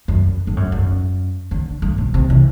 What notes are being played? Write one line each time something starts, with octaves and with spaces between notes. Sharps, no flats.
F#2
G2
F#2
F#2
D3
G2
B2
C3
E3